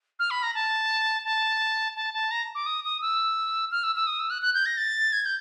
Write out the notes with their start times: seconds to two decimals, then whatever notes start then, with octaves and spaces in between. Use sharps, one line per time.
0.19 F6
0.30 B5
0.43 A#5
0.54 A5
1.25 A5
1.96 A5
2.13 A5
2.31 A#5
2.55 D6
2.66 D#6
2.84 D#6
3.01 E6
3.71 F6
3.83 E6
3.95 E6
4.07 D#6
4.19 E6
4.30 F#6
4.42 F#6
4.54 G6
4.66 A#6
4.77 A6
5.13 G#6
5.25 G6